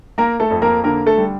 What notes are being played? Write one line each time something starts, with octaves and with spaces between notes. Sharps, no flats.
A#3 A#4
A3 A4
F2
A#3 A#4
D3 A#3 A#4
A3 A4
G3